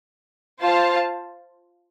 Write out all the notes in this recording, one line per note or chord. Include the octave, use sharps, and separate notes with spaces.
F4 C5 F5 A5